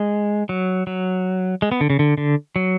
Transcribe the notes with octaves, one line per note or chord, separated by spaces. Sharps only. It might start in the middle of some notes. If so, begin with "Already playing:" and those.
Already playing: G#3
F#3
F#3
G#3
B3
D3
C#3
D3
D3
F#3